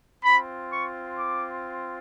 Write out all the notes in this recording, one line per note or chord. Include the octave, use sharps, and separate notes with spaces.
C4 F4 B5
C#6
D6